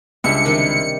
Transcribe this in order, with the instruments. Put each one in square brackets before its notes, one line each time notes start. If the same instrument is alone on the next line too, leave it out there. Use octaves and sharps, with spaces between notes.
[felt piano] C#2 [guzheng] G3 D4 E5 [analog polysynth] C#7
[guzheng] C3 D#3